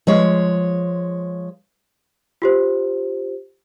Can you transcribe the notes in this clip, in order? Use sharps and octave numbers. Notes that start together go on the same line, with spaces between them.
F3 G#3 C#5
F4 G4 C5